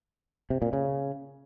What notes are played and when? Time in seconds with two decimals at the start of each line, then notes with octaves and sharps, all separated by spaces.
0.50 C3
0.62 A#2
0.73 C#3